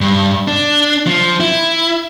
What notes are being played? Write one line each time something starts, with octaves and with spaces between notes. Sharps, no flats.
G2
D4
F3
E4